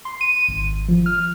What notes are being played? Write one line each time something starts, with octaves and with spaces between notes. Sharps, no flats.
C6
D#7
G#1
F3
F6